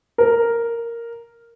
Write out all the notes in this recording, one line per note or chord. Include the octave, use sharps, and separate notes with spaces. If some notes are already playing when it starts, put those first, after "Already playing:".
A#4